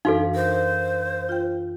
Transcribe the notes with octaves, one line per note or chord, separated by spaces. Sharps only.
F#2 E3 D4 D#4 F#4 A4 F5
A#4 C5
F4 G5